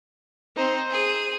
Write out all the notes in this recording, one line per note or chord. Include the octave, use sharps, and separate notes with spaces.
C4 D#4 C5
G#4 D#7